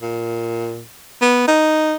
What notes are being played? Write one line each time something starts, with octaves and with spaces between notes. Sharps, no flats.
A#2
B3
D#4